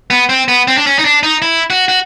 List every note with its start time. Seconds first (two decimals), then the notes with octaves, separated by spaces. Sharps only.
0.10 B3
0.29 C4
0.48 B3
0.68 C4
0.77 D4
0.87 C#4
0.99 D#4
1.05 D4
1.23 D#4
1.42 E4
1.70 F#4
1.88 F#4